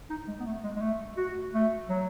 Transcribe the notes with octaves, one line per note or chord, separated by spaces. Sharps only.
D#4
G#3
B3
A3
G#3
G#3
A3
F#4
A3
F#3